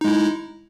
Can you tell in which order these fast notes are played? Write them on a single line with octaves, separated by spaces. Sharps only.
D#4 G#3 E4